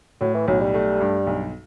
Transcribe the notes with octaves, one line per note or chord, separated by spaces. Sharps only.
A2 F#3
E3
B1 F#3
G3
A3
G2
B1